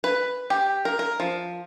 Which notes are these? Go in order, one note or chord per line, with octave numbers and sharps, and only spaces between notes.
B4
G4
A#4
A#4
F3